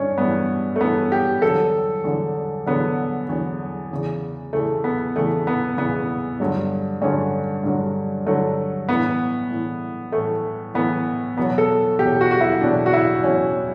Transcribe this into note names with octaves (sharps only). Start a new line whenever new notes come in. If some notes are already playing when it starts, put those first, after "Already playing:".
Already playing: G2 E3 C#4 D4
G2 E3 B3
A3
G2 E3 B3
G4
E2 D3 F#3 A4
E2 D3 F#3
E2 D3 F#3 B3
E2 D3 F#3
E2 C#3 E3
E2 C#3 E3 A3
B3
E2 C#3 E3 A3
B3
E2 C#3 E3 B3
G2 D3 F#3
G2 D3 F#3 C#4
G2 D3 F#3
G2 D3 F#3 A3
A2 E3 B3
A2 E3
A2 E3 A3
A2 E3 B3
E2 B2 F#3 B3
A4
E2 B2 F#3 G4
F#4
F#4
E4
E2 B2 F#3 D4
F#4
E4
E2 B2 F#3 C#4